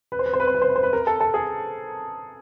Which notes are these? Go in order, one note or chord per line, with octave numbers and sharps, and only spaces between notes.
B4
C5
B4
C5
B4
C5
B4
C5
B4
C5
B4
A#4
A4
A4
G#4